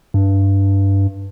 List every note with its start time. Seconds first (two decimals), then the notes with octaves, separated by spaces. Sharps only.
0.14 G2